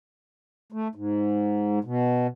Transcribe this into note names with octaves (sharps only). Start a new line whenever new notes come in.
A3
G#2
B2